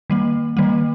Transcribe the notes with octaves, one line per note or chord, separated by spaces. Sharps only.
D#3 G3 A#3
D#3 G3 A#3